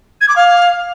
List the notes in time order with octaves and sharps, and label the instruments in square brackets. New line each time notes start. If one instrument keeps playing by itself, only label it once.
[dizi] G#6
D6
F5